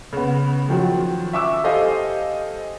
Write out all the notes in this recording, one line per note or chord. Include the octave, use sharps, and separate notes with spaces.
C#3 B3
D#3 F3 F#3
E5 C#6 D6 E6
G4 A4 C5 D#5 F5 G#5